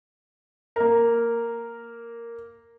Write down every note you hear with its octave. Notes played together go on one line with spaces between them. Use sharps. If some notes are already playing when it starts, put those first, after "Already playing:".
A#3 A#4